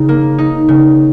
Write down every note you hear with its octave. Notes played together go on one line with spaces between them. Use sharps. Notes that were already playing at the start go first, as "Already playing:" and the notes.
Already playing: C#3 D#4
A#3
D#4
C#3